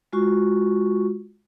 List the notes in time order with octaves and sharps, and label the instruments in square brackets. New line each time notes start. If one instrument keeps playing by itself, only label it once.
[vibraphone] G#3 F4 F#4 C#6